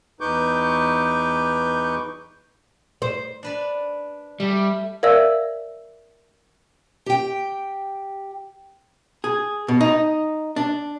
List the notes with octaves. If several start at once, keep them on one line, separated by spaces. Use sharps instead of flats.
E2 D#4 B4 C#6 D6 G6
C5
D4 B4 D5
G3 A3
A#4 D5 E5 F5 E6
G4 G5
G#4
B2
D#4
D4